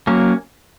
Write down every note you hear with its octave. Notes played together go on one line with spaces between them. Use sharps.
F#3 A#3 C#4